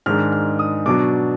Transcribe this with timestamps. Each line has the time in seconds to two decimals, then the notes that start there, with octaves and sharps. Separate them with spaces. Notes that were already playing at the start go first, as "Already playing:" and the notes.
0.06 G#2 D#3 G#3 D4 F6
0.32 F6
0.59 D#6
0.86 B2 F#3 D4 D6